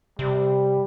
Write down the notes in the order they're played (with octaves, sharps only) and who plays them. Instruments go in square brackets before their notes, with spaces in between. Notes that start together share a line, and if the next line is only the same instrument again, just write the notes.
[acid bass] C3 [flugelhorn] G3